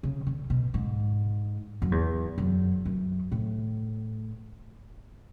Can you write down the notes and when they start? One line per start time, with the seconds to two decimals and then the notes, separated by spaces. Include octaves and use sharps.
0.03 C#3
0.27 D3
0.50 B2
0.74 G#2
1.82 F#2
1.92 E2
2.38 F#2
2.85 F#2
3.32 A2